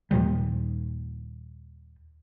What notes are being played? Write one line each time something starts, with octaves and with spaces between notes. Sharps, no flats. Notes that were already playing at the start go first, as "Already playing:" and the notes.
D#2 A#2 F3 G3